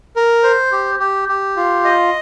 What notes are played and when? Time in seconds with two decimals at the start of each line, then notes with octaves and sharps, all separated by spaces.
0.16 A#4
0.43 C5
0.72 G4
1.00 G4
1.29 G4
1.57 F4
1.84 D#5